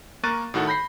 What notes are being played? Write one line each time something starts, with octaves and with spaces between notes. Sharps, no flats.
A#3 A#4 C#6 F#6 A6 D#7
A2 D#3 F#4 A4
B5 G6 A#6 C7